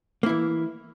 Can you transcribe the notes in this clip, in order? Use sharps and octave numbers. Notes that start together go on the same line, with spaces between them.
E3 A#3 E4